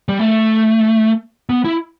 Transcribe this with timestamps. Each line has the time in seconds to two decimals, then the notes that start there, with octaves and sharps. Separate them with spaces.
0.09 G3
0.19 A3
1.49 B3
1.64 E4